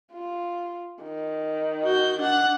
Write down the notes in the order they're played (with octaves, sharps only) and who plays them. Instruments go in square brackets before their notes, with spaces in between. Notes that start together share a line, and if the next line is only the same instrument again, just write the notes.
[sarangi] F4
D#3
[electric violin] F#4 G6
D4 F#5